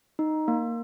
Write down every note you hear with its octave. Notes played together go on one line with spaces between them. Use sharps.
D#4
A#3